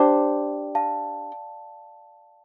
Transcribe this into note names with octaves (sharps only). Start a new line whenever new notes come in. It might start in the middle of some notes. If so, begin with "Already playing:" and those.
Already playing: D4 G4 C5 D5 G5
F5 A5